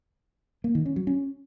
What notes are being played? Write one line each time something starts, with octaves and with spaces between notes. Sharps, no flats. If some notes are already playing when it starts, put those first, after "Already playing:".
A#3
D#3
C#4
F#3
C#4